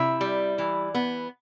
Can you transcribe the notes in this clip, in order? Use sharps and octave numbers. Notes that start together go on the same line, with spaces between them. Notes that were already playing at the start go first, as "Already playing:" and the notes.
Already playing: C3 E4 E5
G3
E3
B3